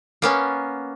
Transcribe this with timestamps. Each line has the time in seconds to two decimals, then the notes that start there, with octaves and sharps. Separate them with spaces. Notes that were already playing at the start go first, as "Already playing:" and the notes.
0.22 A#3 B3 C#4